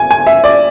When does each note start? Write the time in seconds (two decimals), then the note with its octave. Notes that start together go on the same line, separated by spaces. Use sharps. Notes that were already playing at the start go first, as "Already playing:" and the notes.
Already playing: G#5
0.11 G#5
0.27 E5
0.44 D5